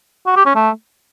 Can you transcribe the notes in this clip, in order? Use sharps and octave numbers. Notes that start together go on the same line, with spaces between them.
F#4
G4
C#4
A3